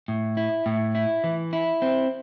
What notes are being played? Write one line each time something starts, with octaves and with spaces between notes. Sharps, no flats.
A2
E4
A2
E4
E3
E4
C4